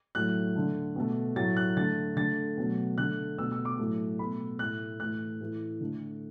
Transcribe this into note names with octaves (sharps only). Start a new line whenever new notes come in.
A2 F#3 A3 F#6
D3 A3
B2 A3
A2 F#3 A3 A6
F#6
D3 A3 A6
D3 A3 A6
B2 F#3 A3
D3 A3 F#6
B2 A3 E6
E6
D6
A2 F#3 A3
B2 A3 B5
A2 A3 F#6
A2 E3 A3 F#6
A2 E3 A3
D3 A3